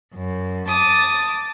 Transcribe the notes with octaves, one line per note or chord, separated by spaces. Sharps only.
F#2
A5 D6 D#6